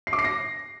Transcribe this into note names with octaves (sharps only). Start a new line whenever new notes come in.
C7
D6
C7
A#6